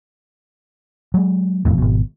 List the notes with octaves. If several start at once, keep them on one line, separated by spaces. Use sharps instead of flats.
F#3 G#3
E1 F2 A2
G#1 B2